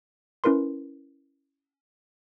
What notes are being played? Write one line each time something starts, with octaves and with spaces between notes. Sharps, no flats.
C#4 E4 A#4 B4 C6